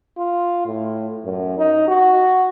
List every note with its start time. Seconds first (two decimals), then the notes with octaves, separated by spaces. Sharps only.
0.18 F4
0.66 A2
1.25 F#2
1.58 D#4
1.88 F#4